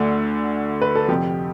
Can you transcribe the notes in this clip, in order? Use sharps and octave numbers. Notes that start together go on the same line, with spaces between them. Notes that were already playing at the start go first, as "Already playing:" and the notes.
Already playing: D2 D3 A3
B4
A4
F2 C3 F3 G4